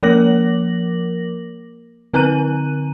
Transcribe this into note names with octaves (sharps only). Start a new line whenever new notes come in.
F3 A#3 A#4 D6 A#6 F#7
D3 C4 B4 A#5 F#6 D#7